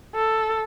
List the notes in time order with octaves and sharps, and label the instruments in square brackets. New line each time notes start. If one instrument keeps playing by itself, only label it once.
[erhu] A4